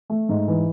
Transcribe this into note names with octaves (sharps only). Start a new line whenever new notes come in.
A3
G#2
E3